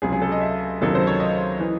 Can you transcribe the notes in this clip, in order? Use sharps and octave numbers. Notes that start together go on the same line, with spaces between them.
C#2 C3 F#3 G#4
G#4
A4
D#5
E5
C#2 C3 D#3 F#3 A4
C5
C#5
D#5
E3